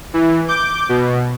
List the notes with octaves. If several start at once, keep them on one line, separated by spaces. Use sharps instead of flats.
E3
D6 G6
B2